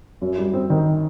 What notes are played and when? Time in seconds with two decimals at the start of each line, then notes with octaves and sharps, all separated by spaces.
0.22 F#2
0.38 G3
0.53 C4
0.70 D#3